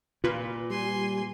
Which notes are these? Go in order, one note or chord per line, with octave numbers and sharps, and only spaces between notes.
A#2 F4 B4
G3 G#5 C6